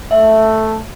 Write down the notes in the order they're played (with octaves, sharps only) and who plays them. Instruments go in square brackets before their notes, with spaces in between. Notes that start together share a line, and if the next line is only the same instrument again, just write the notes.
[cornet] A3 [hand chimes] E5